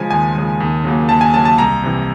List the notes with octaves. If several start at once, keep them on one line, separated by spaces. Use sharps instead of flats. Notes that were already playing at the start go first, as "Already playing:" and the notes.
Already playing: C#3 F3 G#3 G#5
D#2 G#5
C#3 F3 G#3
D#2
C#3 F#3 A#3
D#2 A5
G#5
C#3 F#3 A#3 A5
A5
C2 A#5
C3 E3